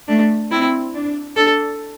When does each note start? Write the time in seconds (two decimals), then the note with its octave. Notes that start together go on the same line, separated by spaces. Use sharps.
0.08 A3 D4
0.51 C4 E4
0.94 D4
1.36 D4 A4